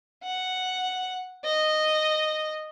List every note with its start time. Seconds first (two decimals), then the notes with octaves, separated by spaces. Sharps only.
0.24 F#5
1.45 D#5